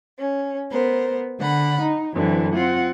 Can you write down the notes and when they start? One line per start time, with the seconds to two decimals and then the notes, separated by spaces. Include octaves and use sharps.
0.17 C#4
0.70 B3 A#4 C5
1.39 D3 F#5 B5
1.81 D#4
2.13 F#2 D3 E3 C4
2.53 C4 F4 F#5